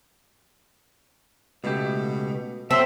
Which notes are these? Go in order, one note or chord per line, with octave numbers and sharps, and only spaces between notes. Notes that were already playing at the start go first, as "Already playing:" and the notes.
C#2 B2 A3 G4
F#3 C4 E5 A5 C6